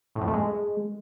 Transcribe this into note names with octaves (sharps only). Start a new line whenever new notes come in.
A2
F2
A3
G#3